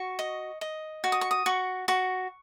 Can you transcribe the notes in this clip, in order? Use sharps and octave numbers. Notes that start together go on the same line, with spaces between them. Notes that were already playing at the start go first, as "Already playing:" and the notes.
Already playing: F#4 C#6
D#5
D#5
F#4
D#6
C#6
D#6
F#4 C#6
F#4 C#6